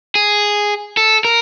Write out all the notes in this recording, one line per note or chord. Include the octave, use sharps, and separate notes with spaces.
G#4
A4
A#4